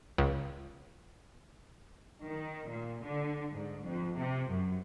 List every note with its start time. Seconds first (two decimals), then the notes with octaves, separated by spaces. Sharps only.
0.18 C#2
2.25 D#3
2.68 A#2
3.05 D3
3.53 G#2
3.85 F2
4.17 C3
4.50 F#2